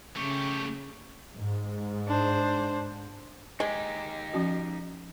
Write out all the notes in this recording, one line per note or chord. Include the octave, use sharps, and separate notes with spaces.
C#3 A3 G4 C#6
G#2
D4 C5
G#3 D#4 G4
F3 C#4 F#4